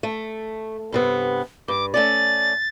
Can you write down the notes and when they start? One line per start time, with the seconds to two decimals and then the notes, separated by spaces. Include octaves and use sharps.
0.03 A3
0.92 G2 C3 B3
1.68 G2 D6
1.94 A3 C#4 D5 A6